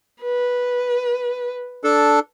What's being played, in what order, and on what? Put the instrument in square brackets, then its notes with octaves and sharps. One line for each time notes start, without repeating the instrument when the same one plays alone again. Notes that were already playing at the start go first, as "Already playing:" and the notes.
[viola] B4
[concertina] D4 A4